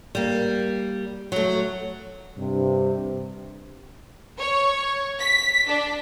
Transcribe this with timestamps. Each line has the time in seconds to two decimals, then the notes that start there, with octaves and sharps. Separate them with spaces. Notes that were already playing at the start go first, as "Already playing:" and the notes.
0.15 G3 A#3
1.32 F#3 A3
2.38 G2 C3
4.39 C#5
5.21 B6
5.69 D4